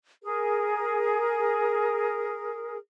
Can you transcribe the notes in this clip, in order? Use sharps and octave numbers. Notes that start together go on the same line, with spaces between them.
G#4 A#4